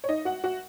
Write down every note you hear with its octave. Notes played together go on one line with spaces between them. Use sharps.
C#5
D#4 D#5
F#4 F#5
F#4 F#5